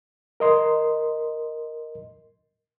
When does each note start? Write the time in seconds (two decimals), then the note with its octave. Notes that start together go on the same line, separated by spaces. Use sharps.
0.40 A#4 D#5 C6